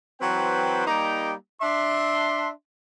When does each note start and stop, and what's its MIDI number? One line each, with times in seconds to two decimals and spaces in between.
0.21 0.85 52
0.21 0.85 54
0.21 0.85 60
0.21 0.85 71
0.21 0.85 72
0.21 0.85 79
0.87 1.33 55
0.87 1.33 58
0.87 1.33 63
0.87 1.33 67
0.87 1.33 79
0.87 1.33 82
1.62 2.49 62
1.62 2.49 76
1.62 2.49 84